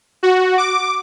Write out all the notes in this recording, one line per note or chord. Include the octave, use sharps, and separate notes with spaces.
F#4
D6